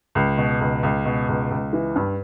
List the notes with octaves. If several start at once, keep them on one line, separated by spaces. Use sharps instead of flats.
C#2
B2
C#2
C#2
B2
C#2
C#2
E3
G2